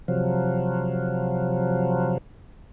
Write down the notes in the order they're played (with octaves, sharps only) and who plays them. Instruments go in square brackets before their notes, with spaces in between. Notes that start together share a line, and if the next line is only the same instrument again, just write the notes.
[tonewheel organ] C3 F3 F#3